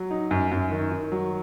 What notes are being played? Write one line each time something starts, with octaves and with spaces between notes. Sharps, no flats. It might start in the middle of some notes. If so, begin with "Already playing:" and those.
Already playing: F#3
D#4
F#2
F#2
D#3
D#3
F#3